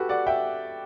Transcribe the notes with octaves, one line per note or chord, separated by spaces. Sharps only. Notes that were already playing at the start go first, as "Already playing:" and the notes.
Already playing: F#4 G4 A4 B4
D5 F#5
E5 G5